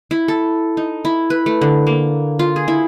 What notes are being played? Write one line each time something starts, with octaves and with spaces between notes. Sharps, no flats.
E4
A4
D#4
E4
B4
A3
D3
A#3
F4
G#4
E4